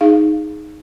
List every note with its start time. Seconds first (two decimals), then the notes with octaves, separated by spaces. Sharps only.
0.01 D#4 G#4 F5